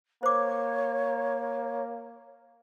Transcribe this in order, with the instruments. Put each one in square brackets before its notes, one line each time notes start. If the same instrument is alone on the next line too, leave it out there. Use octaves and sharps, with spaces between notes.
[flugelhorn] A#3 [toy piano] C5 D6 [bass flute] C#5